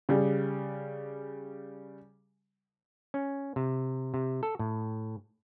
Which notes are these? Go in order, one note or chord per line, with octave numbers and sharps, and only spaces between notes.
C#3 G3
C#4
C3
C3
A4
A2